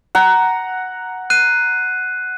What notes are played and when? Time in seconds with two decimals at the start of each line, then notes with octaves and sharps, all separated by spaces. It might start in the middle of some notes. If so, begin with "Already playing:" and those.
0.15 F#5 A#5
1.30 F#6 C7 D#7